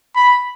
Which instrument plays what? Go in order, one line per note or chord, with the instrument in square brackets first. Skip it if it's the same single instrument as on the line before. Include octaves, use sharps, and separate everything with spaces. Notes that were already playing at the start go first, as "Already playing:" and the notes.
[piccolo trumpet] B5